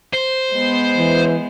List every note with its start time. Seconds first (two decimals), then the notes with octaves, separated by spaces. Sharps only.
0.13 C5
0.53 G#3 B3
0.98 E3